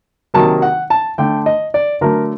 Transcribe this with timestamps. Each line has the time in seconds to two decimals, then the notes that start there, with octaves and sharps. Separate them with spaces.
0.34 C3 D#3 F#3 A#3 A5
0.62 F#5
0.90 A5
1.18 D3 A3 G5
1.46 D#5
1.74 D5
2.01 D3 F#3 A3 A#4